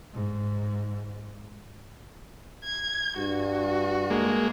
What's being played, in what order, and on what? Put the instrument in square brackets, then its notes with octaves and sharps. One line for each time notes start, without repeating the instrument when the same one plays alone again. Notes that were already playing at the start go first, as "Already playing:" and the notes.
[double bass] G#2
[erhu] G#6
[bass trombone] G2 [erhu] F#4
[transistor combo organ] G#3 A#3